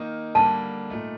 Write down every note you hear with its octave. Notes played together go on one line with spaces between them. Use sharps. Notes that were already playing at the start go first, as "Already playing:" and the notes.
Already playing: D#3 A#3 D#4
D3 G3 A#3 A5
A#2 A3 D#4